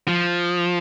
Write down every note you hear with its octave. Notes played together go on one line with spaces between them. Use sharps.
F3